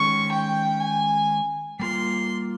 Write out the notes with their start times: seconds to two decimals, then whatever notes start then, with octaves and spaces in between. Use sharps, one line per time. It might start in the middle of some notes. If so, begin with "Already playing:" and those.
Already playing: D#3 G#3 C#4 C#6
0.32 G5
0.80 G#5
1.80 G3 A#3 F4 C6